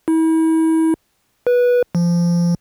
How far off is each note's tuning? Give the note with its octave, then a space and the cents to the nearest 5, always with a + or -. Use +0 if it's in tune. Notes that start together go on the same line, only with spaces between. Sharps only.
E4 -40
B4 -15
F3 -20